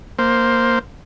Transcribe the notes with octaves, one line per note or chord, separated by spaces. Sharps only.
A#3 C5